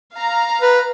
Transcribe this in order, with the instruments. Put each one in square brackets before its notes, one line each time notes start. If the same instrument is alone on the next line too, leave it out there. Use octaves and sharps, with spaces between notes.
[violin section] F5 A#5
[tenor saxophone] B4